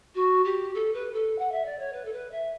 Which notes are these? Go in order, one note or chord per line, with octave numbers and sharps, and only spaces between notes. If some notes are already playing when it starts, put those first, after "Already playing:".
F#4
G4
A4
B4
A4
F#5
E5
D5
C#5
B4
A4
B4
E5